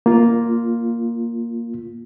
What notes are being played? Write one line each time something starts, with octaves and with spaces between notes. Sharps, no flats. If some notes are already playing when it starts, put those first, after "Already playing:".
A#3 F4